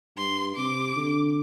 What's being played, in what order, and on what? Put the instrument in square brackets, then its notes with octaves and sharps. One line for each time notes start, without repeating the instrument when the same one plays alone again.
[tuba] G2 [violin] C6
[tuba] C3 [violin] D6
[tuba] D3